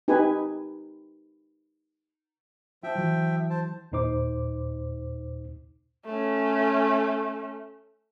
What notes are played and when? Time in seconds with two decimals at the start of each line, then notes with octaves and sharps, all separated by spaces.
0.08 D#4 G4 B4 G#5
2.83 F3 F4 E5 G5
2.95 E3 F#3
3.50 C5 A5
3.92 D#2 A#2 D#4 C5 D6
6.05 A3 C#4